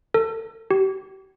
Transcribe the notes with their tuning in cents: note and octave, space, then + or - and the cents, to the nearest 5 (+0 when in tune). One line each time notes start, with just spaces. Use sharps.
A4 +35
G4 -40